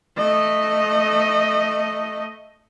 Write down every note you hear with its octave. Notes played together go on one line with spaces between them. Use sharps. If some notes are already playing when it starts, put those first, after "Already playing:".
A3 D#5